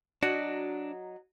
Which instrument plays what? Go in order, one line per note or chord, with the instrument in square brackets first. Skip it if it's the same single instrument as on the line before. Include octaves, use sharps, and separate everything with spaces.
[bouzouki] F#3 D#4 [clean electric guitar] D4 [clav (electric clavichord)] F#4